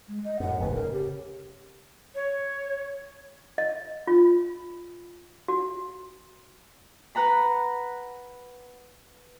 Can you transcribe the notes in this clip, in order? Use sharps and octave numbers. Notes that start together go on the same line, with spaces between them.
G#3
D#5
F#2 A2 F#5
D1 G#1 D#2 B4
C#3 A#4
G4
C#5
D#5
F4
F#4
B4 F#5 A#5 B5